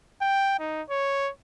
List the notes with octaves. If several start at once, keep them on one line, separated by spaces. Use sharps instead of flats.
G5
D#4
C#5